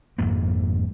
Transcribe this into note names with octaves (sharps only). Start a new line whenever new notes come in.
G#1 F2 G#2 A#3